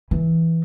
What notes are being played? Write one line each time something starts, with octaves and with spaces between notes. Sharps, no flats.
E3